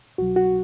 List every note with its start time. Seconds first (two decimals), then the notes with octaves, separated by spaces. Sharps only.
0.18 C2 B2 F#3 F#4
0.36 F#4